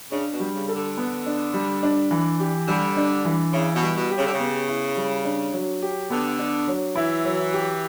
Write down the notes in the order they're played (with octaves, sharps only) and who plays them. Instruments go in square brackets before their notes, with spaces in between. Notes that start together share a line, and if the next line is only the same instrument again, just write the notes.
[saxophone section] C#3 [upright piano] D4
[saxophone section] B2
[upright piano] G3
[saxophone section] C#3
[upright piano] A4
[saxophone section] D3
[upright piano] B3
D4
G3
D4
E3
G4
[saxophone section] D3 [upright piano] G3
[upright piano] D4
E3
[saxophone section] C#3 [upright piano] E4
[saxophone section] B2
[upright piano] G3
[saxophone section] B2
[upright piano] G4
[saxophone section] C#3
D3
C#3
[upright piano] B3
E4
G3
D4
F#3
G4
[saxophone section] D3 [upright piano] B3
[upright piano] D4
F#3
[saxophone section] E3 [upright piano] E4
[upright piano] F#3
G4